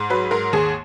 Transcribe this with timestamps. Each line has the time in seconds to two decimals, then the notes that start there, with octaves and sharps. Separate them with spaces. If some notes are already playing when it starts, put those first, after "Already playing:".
Already playing: G#2
0.10 F#3 B4
0.31 G#2 A#4
0.53 D#2 G#4